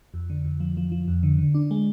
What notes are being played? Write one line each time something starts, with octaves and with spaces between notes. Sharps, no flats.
F2
D3
F2
F3
F3
F3
F2
D3
D3
D4
G#3